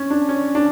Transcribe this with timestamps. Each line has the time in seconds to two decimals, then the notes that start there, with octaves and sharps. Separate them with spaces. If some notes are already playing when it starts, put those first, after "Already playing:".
Already playing: C#4
0.10 D4
0.29 C#4
0.55 D4